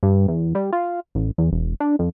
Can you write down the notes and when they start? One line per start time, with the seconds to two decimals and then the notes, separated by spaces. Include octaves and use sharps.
0.03 G2
0.28 E2
0.55 G3
0.72 F4
1.15 A1
1.38 E2
1.51 E1
1.80 D4
1.99 F2